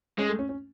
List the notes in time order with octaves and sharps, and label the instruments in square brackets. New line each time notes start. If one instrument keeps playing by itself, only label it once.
[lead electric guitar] G#3 [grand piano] C#4
[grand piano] A3
C#4
C#4